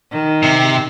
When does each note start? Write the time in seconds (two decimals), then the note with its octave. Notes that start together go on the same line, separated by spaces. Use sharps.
0.12 D#3
0.43 C3